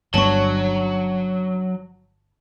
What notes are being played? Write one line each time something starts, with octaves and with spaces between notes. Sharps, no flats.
G1 F#3 G3 B3 C#4 D4 A5 C#6